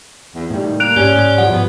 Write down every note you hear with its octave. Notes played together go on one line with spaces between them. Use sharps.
E2
A2 D#3 G3
A#3 F#6 D7 F7
G#2 C#4 G4 D5
F3 G3 F#5
G#2 B3